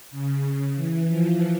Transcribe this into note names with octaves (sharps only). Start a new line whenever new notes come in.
C#3
E3
F3